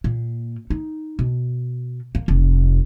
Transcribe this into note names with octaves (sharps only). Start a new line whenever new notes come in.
A#2
D#4
B2
A#3
F1